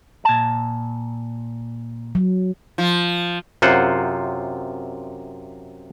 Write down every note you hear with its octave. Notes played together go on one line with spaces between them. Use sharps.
A#2 A5
F#3
F3
F#2 C3 F4 C5 F#5